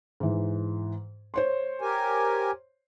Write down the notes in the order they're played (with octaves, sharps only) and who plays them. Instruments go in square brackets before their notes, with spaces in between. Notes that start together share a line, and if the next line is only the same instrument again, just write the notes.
[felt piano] G#2 E3
C5 C#5 C6
[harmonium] G4 A#4 G#5